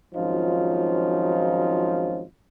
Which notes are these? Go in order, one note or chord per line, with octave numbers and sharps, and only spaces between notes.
G#1 F3 F#3 C#4 D#4 F4